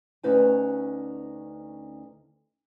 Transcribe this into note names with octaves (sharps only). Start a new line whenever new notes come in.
D2 C#4 D#4 B4 C5 G#5